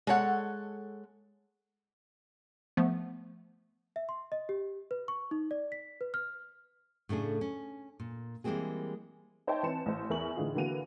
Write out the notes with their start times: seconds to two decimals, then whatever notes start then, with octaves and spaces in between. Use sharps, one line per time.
0.07 G#3 A4 C#5 F#5
2.77 F3 A3 B3
3.96 E5
4.09 C6
4.32 D#5
4.49 G4
4.91 B4
5.08 C#6
5.31 D#4
5.51 D5
5.72 B6
6.01 B4
6.14 F6
7.09 A2 C#3 A3 D4 G#4
7.41 C#4
8.00 A#2
8.44 E3 G3 G#3 A#3 C4 G#4
9.47 D#4 C5 C#5 E5 G5 A5
9.63 E3 C4 A5 C#7 E7
9.86 A1 C5
10.10 E2 A#4 E5 G#5 C#6 F#7
10.36 A2 D3 E3 D#4 F4 G#4
10.55 D3 E3 A#3 F#4 D#7 F7